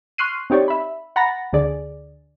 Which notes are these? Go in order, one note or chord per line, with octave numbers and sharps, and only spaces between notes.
C6 C#6 F6 F#6 C7 D#7
C4 D#4 G4 C#5 D5
E5 B5
F#5 A#5 B5 A6 A#6
D2 D3 G#4 D5